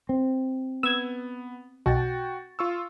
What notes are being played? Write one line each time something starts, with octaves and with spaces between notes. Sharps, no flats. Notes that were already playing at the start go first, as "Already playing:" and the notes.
C4
B3 E6 G#6
B1 F#4 G5 A6
F4 C#6 E6